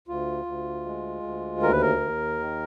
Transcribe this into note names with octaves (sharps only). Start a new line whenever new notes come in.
D2 F4
D2
G#3
D2
D#2 A#4
B4
A#4
D#2
D#3